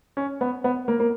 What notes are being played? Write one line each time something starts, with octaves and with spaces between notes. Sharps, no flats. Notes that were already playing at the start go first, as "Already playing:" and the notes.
C#4
B3
B3
A#3
A#3